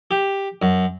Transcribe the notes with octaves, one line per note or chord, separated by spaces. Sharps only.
G4
F#2